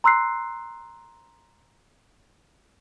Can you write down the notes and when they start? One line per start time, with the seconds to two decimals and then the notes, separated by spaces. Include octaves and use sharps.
0.04 A#5 C6 E6 F#6 C7